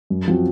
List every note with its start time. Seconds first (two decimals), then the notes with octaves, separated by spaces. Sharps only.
0.10 F#2
0.28 F3 C4 F#4